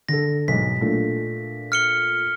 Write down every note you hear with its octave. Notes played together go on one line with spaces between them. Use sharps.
D3 A4 A#6
B1 G#2 B6
A#2 A3 D4
F6 C#7 G7